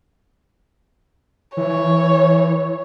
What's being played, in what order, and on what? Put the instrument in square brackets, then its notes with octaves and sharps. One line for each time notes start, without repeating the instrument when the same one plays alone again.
[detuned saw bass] E3 [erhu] C#5